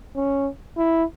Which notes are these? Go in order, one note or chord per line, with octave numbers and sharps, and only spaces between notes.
C#4
E4